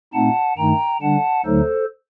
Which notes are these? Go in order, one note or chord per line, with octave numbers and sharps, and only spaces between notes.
A#2 A3 C4 D#4 F#5 A5
G2 D#3 A3 D#4 G5 A#5
D3 G3 D4 F#5 A5
D2 D3 F#3 A3 D#4 A4 C5